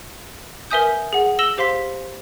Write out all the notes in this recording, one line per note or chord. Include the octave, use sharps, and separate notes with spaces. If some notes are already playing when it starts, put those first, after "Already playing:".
A#4 B4 E5 G#5 D#6 G6
G#4 F#5
E6 A#6 E7 F#7 G7
G4 C5 F5 C6 B6